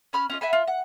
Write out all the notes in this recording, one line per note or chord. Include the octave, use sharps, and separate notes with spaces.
C#4 B5 F6
C#4 F4 D#5
E5 F#5 G#5 B5
F4
F#5